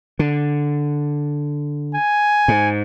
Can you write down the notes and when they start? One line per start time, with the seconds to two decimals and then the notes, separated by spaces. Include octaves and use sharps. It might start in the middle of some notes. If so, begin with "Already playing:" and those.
0.19 D3
1.94 G#5
2.48 G#2